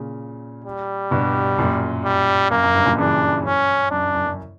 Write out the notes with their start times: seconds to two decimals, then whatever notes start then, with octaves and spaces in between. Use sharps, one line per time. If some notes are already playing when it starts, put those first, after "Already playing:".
Already playing: A#2 C#3
0.65 G3
1.11 G2 B2
1.58 F#2 A#2
2.05 G3
2.51 F#2 A#3
2.64 F#2
2.75 G2
2.86 F#2 A#2
2.98 C#3 E3 D4
3.45 F#2 C#4
3.91 F#2 D4
4.15 F#2
4.27 F#2